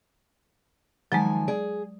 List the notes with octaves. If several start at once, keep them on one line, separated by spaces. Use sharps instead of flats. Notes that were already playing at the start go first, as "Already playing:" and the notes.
D#3 F3 F#3 G#3 G#5
G#4 D5